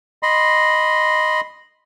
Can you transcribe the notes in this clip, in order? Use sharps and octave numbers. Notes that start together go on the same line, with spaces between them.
D#5 B5 C6